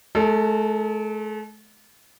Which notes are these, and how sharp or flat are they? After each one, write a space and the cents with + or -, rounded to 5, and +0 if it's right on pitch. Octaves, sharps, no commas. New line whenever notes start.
A3 -45 A4 +30